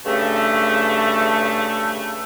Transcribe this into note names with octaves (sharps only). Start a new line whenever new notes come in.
G2 C#3 A3